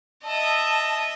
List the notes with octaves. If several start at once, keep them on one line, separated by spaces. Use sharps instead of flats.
D#5 E5 A5